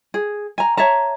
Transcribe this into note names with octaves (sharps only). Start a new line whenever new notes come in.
G#4
G#5 A#5
C#5 E5 A5 A#5